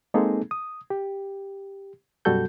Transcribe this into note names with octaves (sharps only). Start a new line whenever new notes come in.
G#3 A#3 C4 D#4 G#4 A4
D#6
G4
F#2 B2 G3 F#4 A4 G6